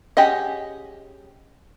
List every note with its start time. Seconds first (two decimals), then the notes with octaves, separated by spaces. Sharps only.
0.17 C#4 G4 G#4 D#5 F#5